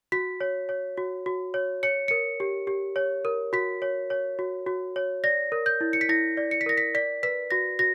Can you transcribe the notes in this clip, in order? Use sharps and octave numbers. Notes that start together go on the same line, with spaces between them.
F#4 B6
C#5
C#5
F#4
F#4
C#5
C#5 C#7
A#4 C#7
G4
G4
C#5
A#4
F#4 B6
C#5
C#5
F#4
F#4
C#5
D5 A#6
A#4
G6
E4
C#7
B6
E4 A#6
D5
C#7
B6
A#4 A#6
B6
D5 B6
B4 B6
F#4 A#6
F#4 A#6